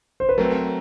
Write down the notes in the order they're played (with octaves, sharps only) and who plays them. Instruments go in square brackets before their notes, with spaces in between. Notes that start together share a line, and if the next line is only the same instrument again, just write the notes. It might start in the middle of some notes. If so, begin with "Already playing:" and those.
[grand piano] C5
B4
[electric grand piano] F#3 A3 C4 [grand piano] A#4